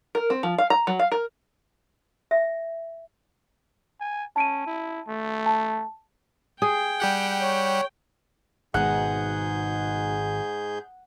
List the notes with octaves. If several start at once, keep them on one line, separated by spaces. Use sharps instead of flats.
A#4
C4
F3
F5
A#5
F#3
F5
A#4
E5
G#5
C#4 A5 D7 D#7
E4
A3
A5
G#4 G5
G3 G4 F#5
C#5
G#1 G#2 B2 G#3 D#4 G#4 F#5 G6